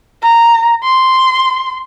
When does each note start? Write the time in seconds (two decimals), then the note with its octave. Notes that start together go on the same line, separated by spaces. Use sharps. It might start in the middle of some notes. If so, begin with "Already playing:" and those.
0.23 A#5
0.84 C6